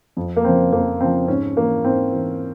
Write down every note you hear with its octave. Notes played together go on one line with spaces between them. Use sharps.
F2
A#3
C#3 F3 C4
F2 A#3
C#3 F3 C4
G#2 C#4
E3 A#3
G#2 C4
E3